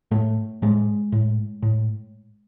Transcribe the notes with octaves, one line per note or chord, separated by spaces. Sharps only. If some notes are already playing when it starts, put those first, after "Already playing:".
A2 A3
A2 G#3
A2
A2